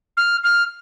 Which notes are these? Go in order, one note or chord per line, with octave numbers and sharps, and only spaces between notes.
F6
F6